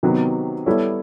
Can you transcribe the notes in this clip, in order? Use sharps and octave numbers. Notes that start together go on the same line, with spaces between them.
C3 D#3 F#3 B3
G3 B3 E4 A4 C#5